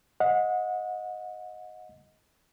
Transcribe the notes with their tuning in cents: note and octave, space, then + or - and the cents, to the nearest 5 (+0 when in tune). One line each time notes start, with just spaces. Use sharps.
D#5 +10 F#5 -30